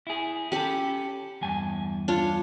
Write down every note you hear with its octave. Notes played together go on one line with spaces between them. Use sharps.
E4 G#4
C#4 G4 A4 B5
E2 G2 G#5
D4 F4 C#5